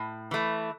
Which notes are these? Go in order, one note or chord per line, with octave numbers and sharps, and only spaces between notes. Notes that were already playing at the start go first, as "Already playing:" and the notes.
Already playing: A2
E3 A3